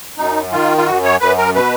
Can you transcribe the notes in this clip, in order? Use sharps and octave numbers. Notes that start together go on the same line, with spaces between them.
F#2 D#4
D#3 F4
F4
F#2 F#4
C#5
F#2 B4
A#4
B2 B4